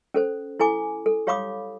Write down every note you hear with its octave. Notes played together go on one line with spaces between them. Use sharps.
C#4 A4 C5
E4 A4 G#5 D6
A4
G4 C#5 F5 B5 D6 D#6